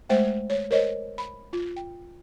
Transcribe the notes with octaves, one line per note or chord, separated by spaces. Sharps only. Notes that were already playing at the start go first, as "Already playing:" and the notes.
G#3 A3 C5 E5 G5
C#5
A#4 C5 C#5 D#5
B5
F4
G5